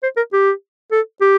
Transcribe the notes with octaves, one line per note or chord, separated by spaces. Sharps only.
C5
A#4
G4
A4
G4